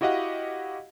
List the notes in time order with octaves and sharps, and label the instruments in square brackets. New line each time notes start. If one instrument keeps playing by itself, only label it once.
[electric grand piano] E4 F#4 G4 D#5 F5 F#5